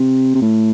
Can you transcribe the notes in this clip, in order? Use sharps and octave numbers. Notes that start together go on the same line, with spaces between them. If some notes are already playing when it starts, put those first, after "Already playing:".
Already playing: C3
C3
A2